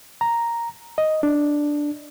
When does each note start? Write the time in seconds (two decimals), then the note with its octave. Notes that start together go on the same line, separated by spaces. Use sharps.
0.21 A#5
0.98 D#5
1.23 D4